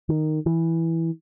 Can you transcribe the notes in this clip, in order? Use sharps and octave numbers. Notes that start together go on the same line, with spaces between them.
D#3
E3